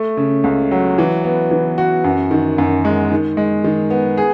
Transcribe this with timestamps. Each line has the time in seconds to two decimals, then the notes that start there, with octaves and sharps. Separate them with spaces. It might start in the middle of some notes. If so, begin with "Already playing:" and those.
Already playing: A3
0.17 C#3
0.44 C#2
0.71 F#3
0.98 E3
1.24 B3
1.51 E3
1.78 F#4
2.04 F#2
2.31 D#3
2.58 F#2
2.85 G#3
3.12 D#3
3.37 G#3
3.64 D#3
3.90 B3
4.17 G#4